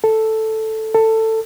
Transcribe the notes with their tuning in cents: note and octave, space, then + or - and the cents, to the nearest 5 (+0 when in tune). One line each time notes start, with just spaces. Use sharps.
A4 +0
A4 +15